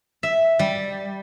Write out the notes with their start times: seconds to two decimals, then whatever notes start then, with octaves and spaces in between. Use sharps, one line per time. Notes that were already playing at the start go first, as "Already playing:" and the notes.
0.23 E5
0.59 G3